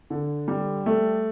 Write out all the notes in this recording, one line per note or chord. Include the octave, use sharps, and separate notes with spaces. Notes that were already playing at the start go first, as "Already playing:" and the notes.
D3
G3
A3